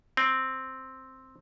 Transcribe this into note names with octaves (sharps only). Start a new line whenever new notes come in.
C4